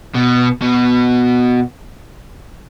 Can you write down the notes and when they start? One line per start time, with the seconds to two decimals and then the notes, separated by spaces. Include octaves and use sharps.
0.15 B2
0.62 B2